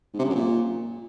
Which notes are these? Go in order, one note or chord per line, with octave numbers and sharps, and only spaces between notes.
G#2
C3
C#3
F#2
A#2